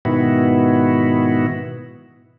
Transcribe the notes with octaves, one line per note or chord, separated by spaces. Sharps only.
G#2 B2 D#3 B3 E4 F#4